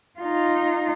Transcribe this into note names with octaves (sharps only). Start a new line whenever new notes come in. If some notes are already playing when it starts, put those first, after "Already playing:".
D#4 F4